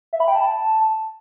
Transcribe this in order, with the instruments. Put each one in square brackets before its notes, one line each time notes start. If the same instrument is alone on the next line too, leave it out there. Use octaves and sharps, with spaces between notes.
[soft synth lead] E5
B5
G5
A5